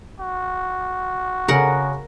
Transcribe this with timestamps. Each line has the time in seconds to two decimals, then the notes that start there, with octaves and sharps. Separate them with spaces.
0.20 F#4
1.48 C#3 G#4 A#4 F#5